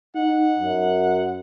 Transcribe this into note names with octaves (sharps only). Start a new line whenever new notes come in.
D#4 F#5
F#2